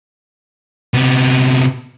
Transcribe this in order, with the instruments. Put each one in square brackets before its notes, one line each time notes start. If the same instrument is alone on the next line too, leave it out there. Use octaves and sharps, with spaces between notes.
[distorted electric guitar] C3 B3